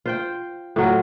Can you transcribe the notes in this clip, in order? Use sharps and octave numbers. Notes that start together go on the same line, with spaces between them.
F4 C5 G5
A2 F#3 F4